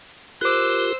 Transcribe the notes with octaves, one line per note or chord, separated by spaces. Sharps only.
F4 G4 A#4 C5 D6 E6 F#6